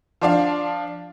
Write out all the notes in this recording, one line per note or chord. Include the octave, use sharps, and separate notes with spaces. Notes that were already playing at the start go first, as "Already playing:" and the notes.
F3 D4 F5